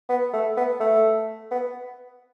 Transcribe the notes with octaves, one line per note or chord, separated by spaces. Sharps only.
B3
A3
B3
A3
B3